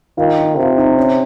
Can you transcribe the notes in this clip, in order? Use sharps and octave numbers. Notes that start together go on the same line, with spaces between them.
D#3 F4
D#4
C3 F4
D#4
C#4